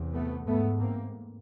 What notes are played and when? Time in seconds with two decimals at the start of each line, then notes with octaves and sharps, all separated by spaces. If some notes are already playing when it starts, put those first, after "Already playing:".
Already playing: E2 C3
0.14 A3 B3
0.47 G#2 A3 B3
0.80 A#3 C4